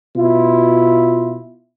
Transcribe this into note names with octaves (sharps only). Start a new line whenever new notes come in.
B2 E4 F4